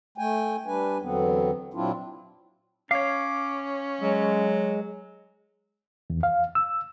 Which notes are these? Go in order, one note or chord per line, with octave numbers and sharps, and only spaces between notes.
A3 G5 G#5
G3 D4 B4 G#5
E2 D3 F#3 B3 C4
A#2 F#3 C4 D4 E4 F4
C#4 C#5 F5 D6
F#3 G#3
E2
F5
E6